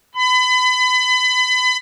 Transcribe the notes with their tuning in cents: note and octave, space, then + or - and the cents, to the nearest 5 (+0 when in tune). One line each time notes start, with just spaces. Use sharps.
B5 +30